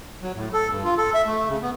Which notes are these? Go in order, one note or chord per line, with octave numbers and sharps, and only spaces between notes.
F#3
A2
A4
G2
F4
A4
E5
A3
C#3
B3